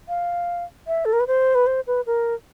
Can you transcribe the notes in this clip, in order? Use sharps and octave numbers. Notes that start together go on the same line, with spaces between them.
F5
E5
A4
A#4
B4
C5
B4
C5
B4
A#4